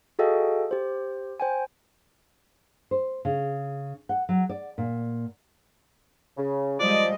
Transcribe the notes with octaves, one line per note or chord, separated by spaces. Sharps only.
F#4 G#4 A4 D#5 F5 G5
G4 C5
C5 G5 G#5
C5
C#3
F#5
F#3
D5
A#2
C#3
F3 G3 G#3 D5 D#5